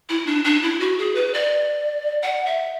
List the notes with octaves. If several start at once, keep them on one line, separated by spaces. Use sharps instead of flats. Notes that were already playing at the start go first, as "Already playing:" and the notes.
E4
D4
D4
E4
F#4
G#4
B4
D5
F#5
E5